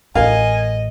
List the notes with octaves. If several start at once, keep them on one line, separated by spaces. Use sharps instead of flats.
A1 A#4 D#5 F5 G#5